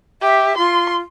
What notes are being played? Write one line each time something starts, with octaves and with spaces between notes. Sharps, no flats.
G4 E5
F4 C6